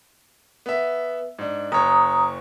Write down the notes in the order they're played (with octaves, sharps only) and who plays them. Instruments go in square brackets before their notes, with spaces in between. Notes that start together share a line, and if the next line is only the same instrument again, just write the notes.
[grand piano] B3 E5
G#2 D4
[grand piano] F#1 C#5 [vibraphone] A#5 D#6